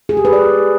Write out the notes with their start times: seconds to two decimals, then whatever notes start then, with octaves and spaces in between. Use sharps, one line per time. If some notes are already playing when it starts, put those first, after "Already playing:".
0.09 G#4
0.17 G4
0.25 B4
0.33 D5